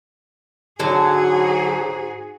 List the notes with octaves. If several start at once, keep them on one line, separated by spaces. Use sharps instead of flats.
G#2 D3 F#3 F#4 G#4